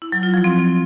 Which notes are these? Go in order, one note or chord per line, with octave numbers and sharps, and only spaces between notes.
E4
F#3
F4
F3
C4